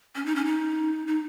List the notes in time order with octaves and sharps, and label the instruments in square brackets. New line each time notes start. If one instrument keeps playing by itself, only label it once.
[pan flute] C#4
D#4
C#4
D#4
D#4